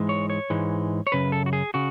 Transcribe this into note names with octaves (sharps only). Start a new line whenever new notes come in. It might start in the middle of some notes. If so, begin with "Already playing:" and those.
Already playing: G#2 E3 G#3
C#5
C#5
G#2 E3 G#3
C#5
F#2 C#3 B4
A4
F#4
G#4
C#3 F#4